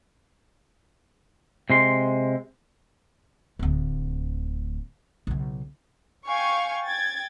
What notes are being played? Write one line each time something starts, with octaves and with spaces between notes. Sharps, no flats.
C3 G#3 C6
D1 D2
B1 C#3
F5 G5 G#5 C#6
G5 G#6 A6